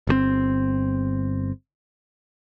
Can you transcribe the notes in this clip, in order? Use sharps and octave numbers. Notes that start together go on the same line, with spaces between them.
G1 B2 C4